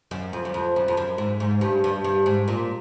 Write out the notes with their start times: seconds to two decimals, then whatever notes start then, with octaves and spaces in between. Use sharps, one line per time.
0.11 F#2
0.33 F2
0.45 F#2
0.54 F2
0.76 F#2
0.88 F2
0.97 F#2
1.18 G#2
1.40 G#2
1.61 G2
1.84 G2
2.04 G2
2.26 G#2
2.48 A#2